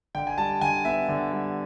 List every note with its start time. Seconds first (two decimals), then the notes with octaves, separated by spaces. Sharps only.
0.15 D3 G5
0.27 G#5
0.38 G3 A5
0.61 D3 G#5
0.85 B3 E5
1.09 D3
1.32 G3